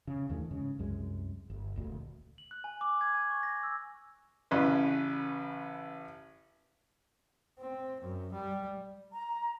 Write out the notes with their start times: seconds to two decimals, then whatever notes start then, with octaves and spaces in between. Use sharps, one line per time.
0.07 C#3
0.29 D#2 A2 D3 E3
0.51 G#2 C#3
0.79 C2 F#2 G#3
1.50 G1
1.76 D#1 D2
2.38 F#7
2.51 F#6
2.64 G#5
2.81 D6
3.01 G#6
3.14 G#5
3.30 C#6
3.43 A#6
3.63 E6
4.51 A1 C#3 B4
7.59 C4
8.01 F#2
8.32 G3
9.13 A#5